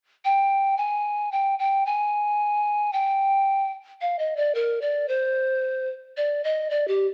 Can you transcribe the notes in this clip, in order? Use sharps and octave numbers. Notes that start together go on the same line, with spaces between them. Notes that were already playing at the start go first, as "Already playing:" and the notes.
G5
G#5
G5
G5
G#5
G5
F5
D#5
D5
A#4
D5
C5
D5
D#5
D5
G4